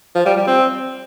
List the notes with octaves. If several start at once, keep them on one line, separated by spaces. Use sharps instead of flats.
F3
G3
G3
C4